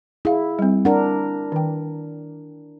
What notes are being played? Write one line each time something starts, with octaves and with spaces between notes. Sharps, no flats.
E4 G#4 F5
G3 C4
D4 A#4 F#5
D#3 G5